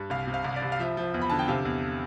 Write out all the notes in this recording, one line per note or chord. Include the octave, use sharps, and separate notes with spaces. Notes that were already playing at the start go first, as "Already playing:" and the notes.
Already playing: G2
C2 F5
C3
F5
C2
D5
C2
F5
F3 E5
F3
E2
B5
D3 A5
G5
C3 F5
E2